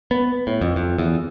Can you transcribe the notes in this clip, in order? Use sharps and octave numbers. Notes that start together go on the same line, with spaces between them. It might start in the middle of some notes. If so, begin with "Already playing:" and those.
B3
A2
F2
F2
E2